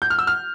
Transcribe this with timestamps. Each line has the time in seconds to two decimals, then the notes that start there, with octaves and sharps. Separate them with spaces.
0.02 G6
0.10 F6
0.19 E6
0.27 F6